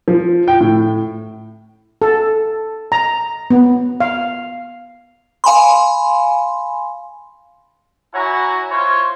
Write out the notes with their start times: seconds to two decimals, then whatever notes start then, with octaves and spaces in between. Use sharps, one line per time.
0.08 F3
0.48 G5
0.61 A2
2.02 A4
2.92 A#5
3.51 B3
4.00 F5
5.44 F5 G#5 B5 C6
8.14 E4 F#4 C#5 F#5 G#5 A#5
8.70 E4 F4 C5 C#5